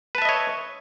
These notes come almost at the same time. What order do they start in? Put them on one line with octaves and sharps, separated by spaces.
B4 A5 E5 D#5 C#5